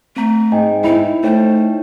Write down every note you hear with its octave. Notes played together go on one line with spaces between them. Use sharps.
A3 C4 A#5
G#2 D#5 G5 G#5
D#4 E4
A3 D#4 C5 C#5 G5